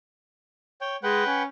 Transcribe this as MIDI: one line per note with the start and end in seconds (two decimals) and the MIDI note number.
0.81 0.97 73
0.81 0.97 79
1.03 1.25 56
1.03 1.43 71
1.03 1.43 78
1.03 1.43 79
1.26 1.45 61